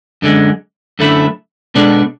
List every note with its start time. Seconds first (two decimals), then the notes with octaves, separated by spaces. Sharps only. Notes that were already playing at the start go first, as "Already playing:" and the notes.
0.22 F#2 D3 G#3
0.99 F#2 D3 A3 E4
1.75 B2 G#3 D4 A4 D5